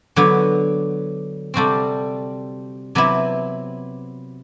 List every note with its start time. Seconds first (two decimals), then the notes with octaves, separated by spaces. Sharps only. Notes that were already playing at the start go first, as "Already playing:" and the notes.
0.16 D3 F#3 B3
1.54 C3 G3 C4 F#4 A4
2.95 C3 F#3 B3 E4